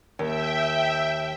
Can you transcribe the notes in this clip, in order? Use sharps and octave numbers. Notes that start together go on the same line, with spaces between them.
D#2 E5 G5